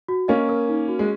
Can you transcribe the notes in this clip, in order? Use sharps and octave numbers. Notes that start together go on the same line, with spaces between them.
F#4
A#3 C#4 D#5
A#4
D#4
F#4
G#3